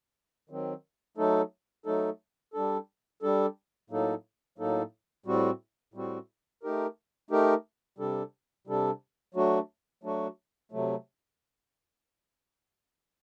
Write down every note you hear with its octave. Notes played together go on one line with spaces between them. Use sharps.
D#3 F#3 C4
F#3 A3 D#4 A4
F#3 A3 D#4 A4
G3 D4 A4
G3 D4 A4
A2 F#3 A#3 D#4 A4
A2 F#3 A#3 D#4 A4
A2 G3 C4 F#4
A2 G3 C4 F#4
A3 D#4 G4 A#4
A3 D#4 G4 A#4
C3 G3 D4 A4
C3 G3 D4 A4
F#3 A3 D4 F#4
F#3 A3 D4 F#4
C3 F#3 A3